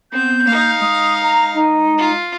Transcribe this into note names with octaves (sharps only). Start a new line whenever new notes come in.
B3 C4 G6
A#3 D#4 F5
G#3 D#6
A#5
D#4
F4